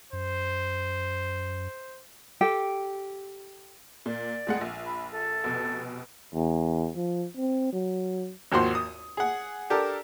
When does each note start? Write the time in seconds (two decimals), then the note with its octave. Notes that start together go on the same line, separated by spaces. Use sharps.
0.13 F#2 C5
2.41 G4 A4 G5
4.06 A#2 D5
4.47 F2 G#3 F#5
4.61 A#1
4.86 B5
5.11 A4
5.44 F1 B2
6.34 E2
6.96 F3
7.37 C4
7.73 F#3
8.52 G#1 D#2 F3 F#4 C5 C6
8.75 D#6
9.17 G#4 F#5
9.70 D4 G4 A4 A#4